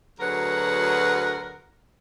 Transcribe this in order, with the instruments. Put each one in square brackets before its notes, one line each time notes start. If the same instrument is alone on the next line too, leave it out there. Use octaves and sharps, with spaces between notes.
[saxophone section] D2 F#3 G#4 A#4 B4 F#5